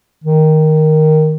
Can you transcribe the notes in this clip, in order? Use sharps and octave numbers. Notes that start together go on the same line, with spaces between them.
D#3